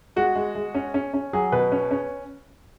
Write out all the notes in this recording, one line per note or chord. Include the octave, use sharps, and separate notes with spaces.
G#3 F#4
G#3
G#3
C#4
C#4
C#4
F#3 G#4
B2 B4
C#4
C#4